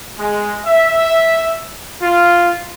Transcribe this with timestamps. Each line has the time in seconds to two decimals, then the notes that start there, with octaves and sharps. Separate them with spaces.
0.19 G#3
0.66 E5
2.01 F4